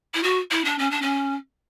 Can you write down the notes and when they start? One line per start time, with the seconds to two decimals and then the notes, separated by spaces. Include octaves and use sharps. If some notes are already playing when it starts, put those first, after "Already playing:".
0.14 E4
0.23 F#4
0.51 E4
0.65 D4
0.78 C#4
0.91 D4
1.02 C#4